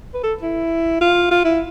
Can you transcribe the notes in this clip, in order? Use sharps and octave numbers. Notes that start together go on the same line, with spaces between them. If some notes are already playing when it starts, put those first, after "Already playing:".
B4
A4
E4
F4
F4
E4